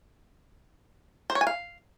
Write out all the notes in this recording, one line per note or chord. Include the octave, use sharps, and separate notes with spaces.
C5
C#5
G#5
F5